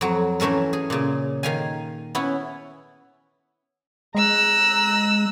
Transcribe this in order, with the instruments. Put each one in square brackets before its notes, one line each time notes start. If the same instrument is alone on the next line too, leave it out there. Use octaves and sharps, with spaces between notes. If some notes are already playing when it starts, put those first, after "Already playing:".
[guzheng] F2 F#3
E3 A3 C#4 A4 A#4
G#4
A#2 C#3
D#3 F5 G#5
B3 C#4 E4
[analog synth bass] G#3 [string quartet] A#5 E6 F#6